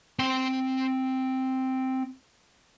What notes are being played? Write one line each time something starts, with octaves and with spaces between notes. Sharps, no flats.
C4 G5